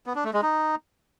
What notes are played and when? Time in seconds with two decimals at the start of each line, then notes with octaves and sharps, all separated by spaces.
0.06 B3
0.15 D4
0.24 A3
0.33 G#3
0.42 D#4